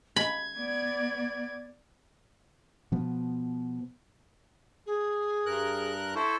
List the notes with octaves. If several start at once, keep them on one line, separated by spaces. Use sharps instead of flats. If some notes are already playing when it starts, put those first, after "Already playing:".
B5 G#6
B3 D5
B2 F3 B3
G#4
G2 A#4 F#6
E4 A4 C5 C#6